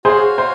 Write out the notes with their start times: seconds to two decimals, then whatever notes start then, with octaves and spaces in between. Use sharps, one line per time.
0.05 F#4 G#4 C5 C#5 F5 G#5
0.38 C5